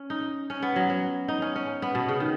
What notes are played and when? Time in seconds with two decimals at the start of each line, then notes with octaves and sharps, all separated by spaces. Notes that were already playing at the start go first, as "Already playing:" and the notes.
Already playing: C#4
0.10 D#4
0.50 C#4
0.62 B3
0.76 F#3
0.90 F#3
1.28 D#4
1.42 C#4
1.56 C#4
1.82 B3
1.95 B2
2.09 C#3
2.20 D#3